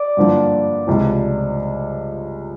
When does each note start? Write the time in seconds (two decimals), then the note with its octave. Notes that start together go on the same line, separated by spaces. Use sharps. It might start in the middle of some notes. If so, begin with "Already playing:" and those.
Already playing: D5
0.17 G2 D3 F3 A#3
0.87 C#2 C3 F3